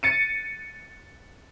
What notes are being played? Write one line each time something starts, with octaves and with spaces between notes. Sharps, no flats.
A6 C#7 D#7